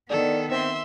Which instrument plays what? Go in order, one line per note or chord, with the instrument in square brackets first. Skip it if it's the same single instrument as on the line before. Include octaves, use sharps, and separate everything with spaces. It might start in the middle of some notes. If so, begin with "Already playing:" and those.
[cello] D#3 B3 [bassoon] D4 [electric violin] A4
[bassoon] C4 [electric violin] E5 C6